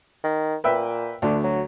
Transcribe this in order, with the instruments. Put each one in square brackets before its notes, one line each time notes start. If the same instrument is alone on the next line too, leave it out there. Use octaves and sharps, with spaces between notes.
[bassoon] D#3
[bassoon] A#2 [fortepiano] B4 E5 G5
[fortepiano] D2 D3 [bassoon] D4
[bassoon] F#3